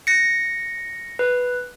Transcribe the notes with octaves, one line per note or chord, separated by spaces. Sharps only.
A#6 C#7
B4